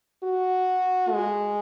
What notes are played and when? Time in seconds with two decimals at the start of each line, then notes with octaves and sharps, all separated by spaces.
0.24 F#4
1.12 G#3